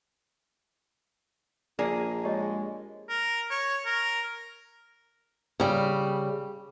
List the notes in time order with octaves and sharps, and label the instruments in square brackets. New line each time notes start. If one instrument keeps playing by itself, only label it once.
[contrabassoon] A#1 [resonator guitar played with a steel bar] A#3 G#4 [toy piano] D5
[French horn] G#3 [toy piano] G4 C#5 D#5
[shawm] A#4
C#5
A#4
[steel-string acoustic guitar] C#3 G3